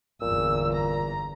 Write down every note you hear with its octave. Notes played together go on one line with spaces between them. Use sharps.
G1 E2 A#2 E6
A#5